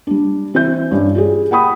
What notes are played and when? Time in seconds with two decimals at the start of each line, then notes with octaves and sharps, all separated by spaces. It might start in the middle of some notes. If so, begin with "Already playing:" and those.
0.07 G3 D4
0.54 E3 C4 E5 G6
0.91 G2 C#4
1.15 F4 G4 G#4
1.51 F#5 G5 B5 D#6